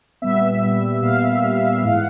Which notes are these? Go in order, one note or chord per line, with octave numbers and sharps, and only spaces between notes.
A#2 G3 B3 E5
A#2 G3 B3
A#2 G3 B3 F5
A#2 G3 B3
G#2 E3 G#3 F5
F#5